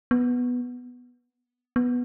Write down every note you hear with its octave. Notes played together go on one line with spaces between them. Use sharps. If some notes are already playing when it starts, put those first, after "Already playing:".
B3
B3